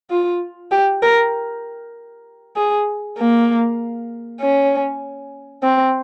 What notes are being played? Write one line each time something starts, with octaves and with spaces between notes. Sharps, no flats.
F4
G4
A#4
G#4
A#3
C#4
C4